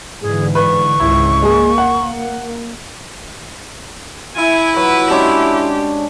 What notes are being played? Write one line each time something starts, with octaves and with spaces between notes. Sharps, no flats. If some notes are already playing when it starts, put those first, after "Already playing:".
G#2 D3 E3 G#4
B4 C#6
G#1 C#2 E4
G#3 A#3 G#4
F#5
E4 G#5
F#3 B4
G#3 C#4 D4 G4